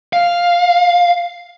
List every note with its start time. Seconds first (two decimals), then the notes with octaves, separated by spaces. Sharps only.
0.13 F5